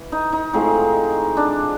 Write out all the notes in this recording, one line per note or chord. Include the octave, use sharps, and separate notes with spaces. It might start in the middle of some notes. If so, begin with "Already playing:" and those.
Already playing: E3
D#4
D#4
A2 F3 G#3 C4 D#4
D4